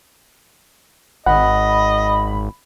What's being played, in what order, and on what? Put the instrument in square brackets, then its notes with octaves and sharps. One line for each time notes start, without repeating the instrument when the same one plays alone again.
[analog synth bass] G#1 [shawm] D#5 [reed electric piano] F#5 [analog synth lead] B5